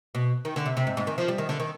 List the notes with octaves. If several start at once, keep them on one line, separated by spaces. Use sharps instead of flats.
B2
D#3
D3
C3
C3
G#2
G#2
D#3
F3
G3
D#3
D3
D#3